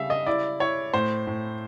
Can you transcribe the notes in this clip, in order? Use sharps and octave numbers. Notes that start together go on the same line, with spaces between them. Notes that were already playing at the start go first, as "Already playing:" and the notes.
Already playing: C#3 G3 E5 F5
D#5
E4 D5
E4 C#5
A2 C5
A2